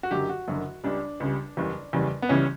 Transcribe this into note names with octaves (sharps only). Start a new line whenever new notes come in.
F#4
F#1 F#2 D3 F#3 G4
F#4
F#1 F#2 D3 F#3
C#2 C#3 G3 D4
C#2 C#3 G3
F#1 E2 C#3 G3
F#1 E2 C#3 G3
B3
C#2 C#3 E3 G3 C#4